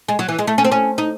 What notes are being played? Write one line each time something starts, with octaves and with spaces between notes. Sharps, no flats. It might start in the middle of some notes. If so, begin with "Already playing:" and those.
G#3
F#3
E3
G#3
A3
C#4
C4
C#4
D#4